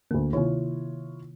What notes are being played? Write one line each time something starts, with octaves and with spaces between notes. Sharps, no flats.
D2 D3 A#3
C3 D#3 E4 F4 C#5